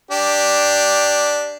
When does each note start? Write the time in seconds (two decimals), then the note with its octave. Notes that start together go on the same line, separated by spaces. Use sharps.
0.11 D4 G4